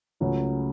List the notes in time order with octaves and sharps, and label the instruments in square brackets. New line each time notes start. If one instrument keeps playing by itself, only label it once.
[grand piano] C#2 C#3 F#3 A3 C#4